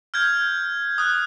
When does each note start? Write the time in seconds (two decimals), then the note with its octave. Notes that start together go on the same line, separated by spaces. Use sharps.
0.14 F6 G6 G#6
0.98 D#6 F#6